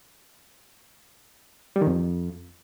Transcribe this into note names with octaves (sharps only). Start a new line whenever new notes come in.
G3
D#3
F2